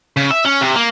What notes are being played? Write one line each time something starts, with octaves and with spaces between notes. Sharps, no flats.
C#3
E5
C#4
C3
A#3